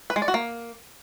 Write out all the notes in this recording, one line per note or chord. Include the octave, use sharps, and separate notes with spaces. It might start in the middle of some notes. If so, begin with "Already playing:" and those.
B4
G#3
D5
F#4
A#3